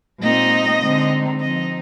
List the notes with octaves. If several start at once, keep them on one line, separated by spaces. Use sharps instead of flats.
A#2 G#3 C4 D#4 D#5
D3 G#3 C4 D#4
F3 C4 D#4 D#5